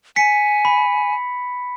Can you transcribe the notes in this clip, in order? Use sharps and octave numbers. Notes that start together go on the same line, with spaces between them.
G#5 B6 C#7
B5